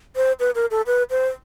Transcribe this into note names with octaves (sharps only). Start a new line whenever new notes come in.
C5
B4
A#4
A4
B4
C5